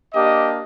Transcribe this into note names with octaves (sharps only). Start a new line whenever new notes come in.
A#3 D4 G4 D#5